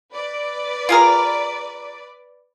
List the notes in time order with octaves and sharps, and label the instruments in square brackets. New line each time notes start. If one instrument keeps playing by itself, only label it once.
[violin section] B4 D5
[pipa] F4 G#4 A#4